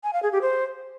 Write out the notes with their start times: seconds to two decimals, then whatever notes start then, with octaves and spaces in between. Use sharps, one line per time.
0.04 G#5
0.13 F5
0.23 G#4
0.32 G4
0.42 C5